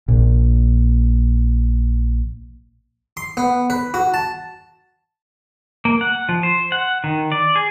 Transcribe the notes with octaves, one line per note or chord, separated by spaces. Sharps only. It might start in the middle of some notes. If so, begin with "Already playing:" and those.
A#1 A#2
C6
B3
B4
F#4
A5
A#3
F#5
F3
C5
F#5
D#3
D5
G#4